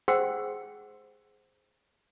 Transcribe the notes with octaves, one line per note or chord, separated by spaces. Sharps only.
G#4 C5 F#5 G5 C6 E6